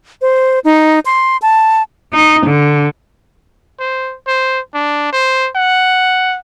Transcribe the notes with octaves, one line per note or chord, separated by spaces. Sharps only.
C5
D#4
C6
A5
D#4
D3
C5
C5
D4
C5
F#5